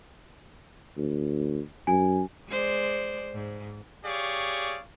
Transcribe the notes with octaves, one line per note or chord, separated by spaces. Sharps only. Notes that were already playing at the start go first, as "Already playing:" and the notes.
D2
F#2 G#5
G#3 C5 D5
G#2
G4 G#4 C#5 D5 F5 C#6